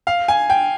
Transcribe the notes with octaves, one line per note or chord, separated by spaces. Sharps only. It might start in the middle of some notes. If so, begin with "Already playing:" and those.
F5
G#5
G5